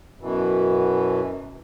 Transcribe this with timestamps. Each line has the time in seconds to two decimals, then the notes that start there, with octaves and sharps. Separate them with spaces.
0.20 F#2 B2 E3